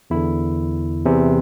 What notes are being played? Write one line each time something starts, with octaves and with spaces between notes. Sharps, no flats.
E2 D3 E4
E2 C3 E3